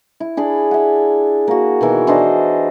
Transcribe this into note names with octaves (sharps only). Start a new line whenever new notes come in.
E4
D4 G#4 B5
E5 F#5
A#3 F#4
B2 D#3 E3 C#5
E3 D4 C5 D#5